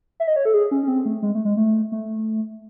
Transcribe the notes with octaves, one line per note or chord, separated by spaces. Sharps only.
E5
D#5
C#5
A4
G#4
C#4
C#4
C4
A3
G#3
A3
G#3
A3
A3